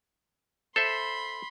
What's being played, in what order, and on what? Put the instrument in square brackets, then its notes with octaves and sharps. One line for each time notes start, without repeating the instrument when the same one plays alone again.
[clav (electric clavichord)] A4 C5 E5 [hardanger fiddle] B5 C6